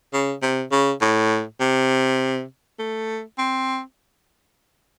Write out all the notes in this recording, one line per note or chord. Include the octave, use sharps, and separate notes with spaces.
C#3
C3
C#3
A2
C3
A3
C4